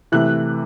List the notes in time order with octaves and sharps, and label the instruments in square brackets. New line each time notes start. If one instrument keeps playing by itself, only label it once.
[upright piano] C3 E3 A3 F#6